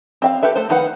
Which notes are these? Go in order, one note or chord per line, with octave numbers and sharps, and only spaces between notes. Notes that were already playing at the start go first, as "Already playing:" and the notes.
C4 E5 F5
G4 A4 B4 E5
A3 A4 C5
D#3 D#4 B4 F5 F#5